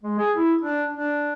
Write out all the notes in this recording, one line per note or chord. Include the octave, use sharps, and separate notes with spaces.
G#3
G#4
E4
D4
D4